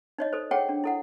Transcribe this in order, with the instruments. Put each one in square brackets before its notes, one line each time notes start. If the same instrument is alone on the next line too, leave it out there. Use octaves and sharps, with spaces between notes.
[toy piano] D#4 C#5 D#5
A4 C5
G#4 A4 C#5 F#5 G5
D4
E4 A4 F#5